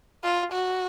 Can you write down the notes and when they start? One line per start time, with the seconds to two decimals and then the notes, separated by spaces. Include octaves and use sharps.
0.24 F4
0.52 F#4